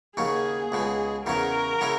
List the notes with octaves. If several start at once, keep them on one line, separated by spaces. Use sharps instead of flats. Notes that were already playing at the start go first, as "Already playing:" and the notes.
D#2 C#3 F#3 C#4 G#4
C#2 B2 G#3
E2 C#3 F#3 C#4 A#4
C#3 F#3 C#4 E4